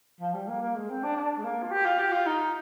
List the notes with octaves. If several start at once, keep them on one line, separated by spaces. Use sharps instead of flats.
F3
G3
A#3
A#3
G#3
C4
D4
D4
G#3
A#3
F4
G4
F4
G4
F4
D#4